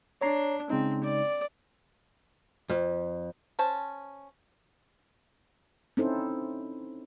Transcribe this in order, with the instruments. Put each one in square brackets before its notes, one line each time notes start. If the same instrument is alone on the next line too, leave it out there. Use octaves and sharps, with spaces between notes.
[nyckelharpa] D4 [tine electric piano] C#5 A#5 C7
[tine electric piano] C#3 G#3 D#4 [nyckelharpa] C4
[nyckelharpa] D5
[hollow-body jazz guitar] F2
[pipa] C#4 C5 A5
[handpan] C4 C#4 D#4 E4 A4 C5